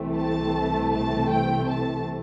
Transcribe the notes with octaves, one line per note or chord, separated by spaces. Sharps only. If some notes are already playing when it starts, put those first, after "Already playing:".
Already playing: C2 C3 E3 A3 C4
A5
A5
G5
A5